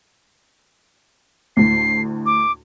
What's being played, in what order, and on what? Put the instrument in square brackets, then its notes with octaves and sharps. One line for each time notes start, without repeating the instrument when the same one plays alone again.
[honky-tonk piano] D2 A2 [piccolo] C7
[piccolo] D6